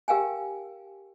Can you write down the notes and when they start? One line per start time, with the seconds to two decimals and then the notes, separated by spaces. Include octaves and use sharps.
0.08 G4 A#4 F5 G5 G#5